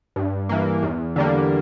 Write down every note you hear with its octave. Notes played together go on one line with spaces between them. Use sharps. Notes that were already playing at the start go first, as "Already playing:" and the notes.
G2
E3 A#3
E2
D3 G3 A#3